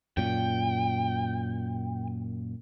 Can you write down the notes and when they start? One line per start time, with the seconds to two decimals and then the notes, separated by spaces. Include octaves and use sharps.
0.17 F#2 A#2 G5